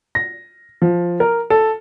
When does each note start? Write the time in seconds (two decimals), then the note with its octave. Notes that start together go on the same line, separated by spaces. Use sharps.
0.15 A#6
0.82 F3
1.20 A#4
1.50 A4